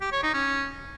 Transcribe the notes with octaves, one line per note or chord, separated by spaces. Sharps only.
G4
C#5
D#4
C#4